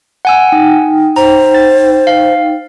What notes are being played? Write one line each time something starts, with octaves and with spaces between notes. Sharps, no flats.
F#5 G#5 E6
D#4 G5
C5 A#5
A6
F5